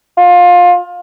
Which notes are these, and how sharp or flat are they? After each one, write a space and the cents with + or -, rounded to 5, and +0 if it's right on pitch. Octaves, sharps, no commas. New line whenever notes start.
F4 +20